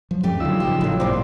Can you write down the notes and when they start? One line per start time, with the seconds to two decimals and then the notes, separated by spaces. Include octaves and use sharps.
0.11 F3 F#3
0.23 D2 G2 A3 C#4 G4 D5
0.40 D3 F3 F#3 D#4 F4 E6
0.60 A1 C#3 F3 G4
0.81 A2 F#3
1.00 G2 A#2 C4 C5 D5